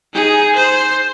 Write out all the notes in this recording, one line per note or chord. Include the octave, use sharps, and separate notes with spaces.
D#4 G#4
C5